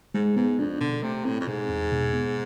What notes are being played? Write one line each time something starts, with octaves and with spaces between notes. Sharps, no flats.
G#2 G#3
G#2 B3
F2 D4
B2 D3
C3 A3
A2 C4
F2
G#2 B2
E2
B2
B3